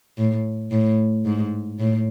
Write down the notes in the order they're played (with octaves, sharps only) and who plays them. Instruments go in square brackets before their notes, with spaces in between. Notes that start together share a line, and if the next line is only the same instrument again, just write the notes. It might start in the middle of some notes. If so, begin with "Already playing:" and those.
[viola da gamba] A2
A2
G#2
A2